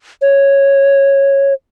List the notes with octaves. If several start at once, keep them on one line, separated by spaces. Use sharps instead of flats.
C#5